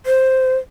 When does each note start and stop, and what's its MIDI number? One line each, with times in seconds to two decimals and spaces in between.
0.06 0.57 72